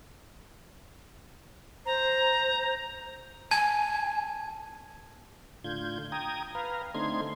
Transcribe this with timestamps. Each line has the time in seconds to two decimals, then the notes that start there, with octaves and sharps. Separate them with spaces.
1.86 C5 A#5
3.51 G#5 A5 G#6
5.64 A2 D3 F4 G6 G#6
6.12 G5 A#5 D#6 G#6
6.55 B4 F5 A#5
6.94 D3 A3 C4 D#4 C6 G#6